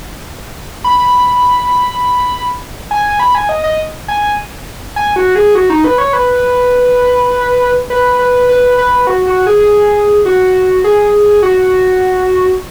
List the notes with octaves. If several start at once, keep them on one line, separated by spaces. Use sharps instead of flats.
B5
G#5
B5
G#5
D#5
D#5
G#5
G#5
F#4
G#4
F#4
D#4
B4
C#5
B4
B4
B4
B4
B4
F#4
F#4
G#4
F#4
G#4
F#4